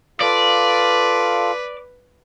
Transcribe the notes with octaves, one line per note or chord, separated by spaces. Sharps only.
F4 A4 B4 D5 F5